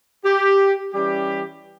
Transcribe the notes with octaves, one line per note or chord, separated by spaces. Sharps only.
G4
E3 G3 C#4 G4